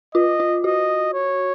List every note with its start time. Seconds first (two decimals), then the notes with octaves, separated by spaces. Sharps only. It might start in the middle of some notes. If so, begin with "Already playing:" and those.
0.15 F4 D#5
0.40 F4
0.64 F#4 D#5
1.14 C#5